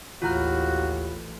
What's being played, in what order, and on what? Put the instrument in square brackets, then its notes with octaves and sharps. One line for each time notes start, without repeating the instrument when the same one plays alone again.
[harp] A1 A#5 F6 [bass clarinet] D#2 [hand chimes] F4 F#6 [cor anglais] F#4